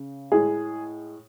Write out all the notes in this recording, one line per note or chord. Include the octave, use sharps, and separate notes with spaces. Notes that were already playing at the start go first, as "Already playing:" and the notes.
Already playing: C#3
A2 G#3 G#4